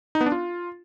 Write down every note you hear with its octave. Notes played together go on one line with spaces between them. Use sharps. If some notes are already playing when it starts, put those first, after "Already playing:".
D#4
B3
D4
F4